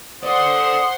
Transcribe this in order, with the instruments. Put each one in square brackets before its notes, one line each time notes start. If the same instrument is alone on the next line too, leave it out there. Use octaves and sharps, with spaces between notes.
[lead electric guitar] A4 D5 [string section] C5 F#5 C6 [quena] D#6